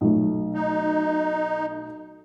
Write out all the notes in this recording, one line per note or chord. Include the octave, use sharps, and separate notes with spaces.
B1 A3
D#4